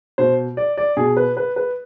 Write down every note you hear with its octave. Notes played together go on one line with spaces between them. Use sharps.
B2 C5
D5
D5
B2 G#4
B4
B4
B4